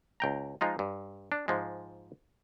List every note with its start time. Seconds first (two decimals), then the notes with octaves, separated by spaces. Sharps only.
0.20 C#2 G5 A#5
0.61 F3 G#3 D#4 F4
0.79 G2
1.32 D4
1.48 G#2 F3 G#3